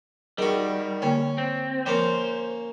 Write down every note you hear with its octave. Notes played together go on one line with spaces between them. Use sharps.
D#3 G3 F#4 G#4
D3 A#3 C#4 G5
C4
F3 A#3 C#4 C5